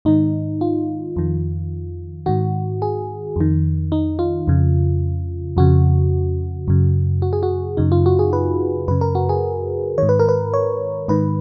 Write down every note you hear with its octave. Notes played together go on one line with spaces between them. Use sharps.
G#2 D#3 D#4
F4
F2 D#3
G#2 D#3 F#4
G#4
F2 D#3
D#4
F4
F2 C#3
F2 C#3 F#4
F#2 C#3
F#4
G#4
F#4
F#2 C#3 D#4
F4
F#4
G#4
B4
F#2 C#3 B4
A#4
F#4
G#4
G#2 D#3 C#5
B4
A#4
B4
C#5
G#2 D#3 B4